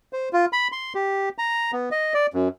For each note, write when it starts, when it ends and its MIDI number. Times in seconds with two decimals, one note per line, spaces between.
0.13 0.29 72
0.33 0.46 65
0.53 0.68 83
0.72 0.93 84
0.95 1.29 67
1.38 1.71 82
1.73 1.89 59
1.92 2.14 75
2.14 2.27 74
2.34 2.48 42